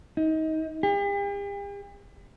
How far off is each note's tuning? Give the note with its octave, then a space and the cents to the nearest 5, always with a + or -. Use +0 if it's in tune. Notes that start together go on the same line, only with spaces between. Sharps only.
D#4 +25
G4 +45